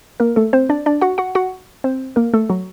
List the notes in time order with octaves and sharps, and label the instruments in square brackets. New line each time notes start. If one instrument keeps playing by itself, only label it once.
[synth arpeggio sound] A#3 A#4
A3 A4
C4 C5
D4 D5
D4 D5
F#4 F#5
F#4 F#5
F#4 F#5
C4 C5
A#3 A#4
A3 A4
F#3 F#4